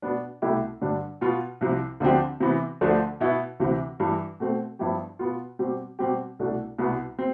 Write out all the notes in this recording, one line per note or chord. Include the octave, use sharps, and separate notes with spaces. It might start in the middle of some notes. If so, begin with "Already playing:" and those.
B2 B3 D4
C2 B2 A3 E4 G4
G2 D3 G3 D4
B2 B3 F4
C2 C3 F3
D2 D3 F3 C4 G4
C3 E3 B3
D2 D3 F3 A3 D4
B2 B3 E4
D2 C3 E3
G2 E3 G3
B2 A3 C4
G2 F3 B3 E4 G4
B2 B3 F4
B2 G3 C4 G4
B2 G3 C4 G4
C2 B2 A3 D4
C2 B2 G3 B3
C4